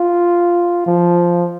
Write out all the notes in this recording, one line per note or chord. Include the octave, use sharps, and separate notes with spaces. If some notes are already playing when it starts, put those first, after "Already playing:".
Already playing: F4
F3